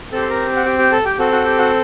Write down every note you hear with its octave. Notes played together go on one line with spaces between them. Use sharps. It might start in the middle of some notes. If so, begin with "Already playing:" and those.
C4 G4 A4 A5
C6
A#4 A#5
F#5
G4 G5
G4 G5
A4 A5
G4 G5
C4 F#4 A4
F#4 F#5
G4 G5
F#4 F#5